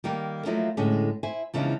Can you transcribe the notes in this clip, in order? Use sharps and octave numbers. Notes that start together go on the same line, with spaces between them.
D#3 G3 A#3 A#4
F3 F#3 A3 A#3 D#4 E4
A2 D3 G#3 C#4
E4 C5 G#5
E2 C#3 E3 F3 G#3 D4